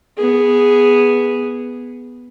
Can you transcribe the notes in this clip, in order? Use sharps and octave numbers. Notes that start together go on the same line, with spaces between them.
B3 G#4